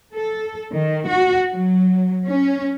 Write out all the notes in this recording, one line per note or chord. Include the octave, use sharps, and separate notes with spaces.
A4
D#3
F#4
F#3
C#4